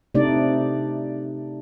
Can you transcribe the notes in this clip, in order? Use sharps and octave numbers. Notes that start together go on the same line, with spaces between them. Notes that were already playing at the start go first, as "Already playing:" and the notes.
C3 A3 D4 D#4 D5